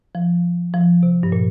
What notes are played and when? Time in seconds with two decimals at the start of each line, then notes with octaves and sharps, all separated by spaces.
0.15 F3
0.74 F3
1.03 C3
1.23 G2
1.32 A#2